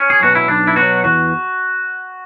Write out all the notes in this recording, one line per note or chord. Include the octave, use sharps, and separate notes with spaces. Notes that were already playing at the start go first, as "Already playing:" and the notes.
Already playing: C#4
G#4
B2 F#3 F#4
E4
B1 D4
E4
B2 F#3 F#4
E2 F#4